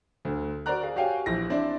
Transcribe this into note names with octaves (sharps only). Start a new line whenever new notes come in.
D2 D3
F#4 A#4 C5 D5 A#5 F#6
G#4 F5
F#4 G4 C#5 F5 G5 G#5
A#1 E3 A#6
C4 D4 E4 C5 D5